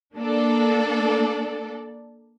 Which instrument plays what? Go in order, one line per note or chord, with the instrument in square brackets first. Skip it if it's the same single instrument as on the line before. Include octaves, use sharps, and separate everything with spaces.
[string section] A#3 D4 A4 D5